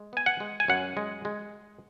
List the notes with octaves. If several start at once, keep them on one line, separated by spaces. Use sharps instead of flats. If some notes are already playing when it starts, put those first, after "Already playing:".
Already playing: G#3
B3 G#5
F#5
G#3
G#5
F#2 F#5
G#3
G#3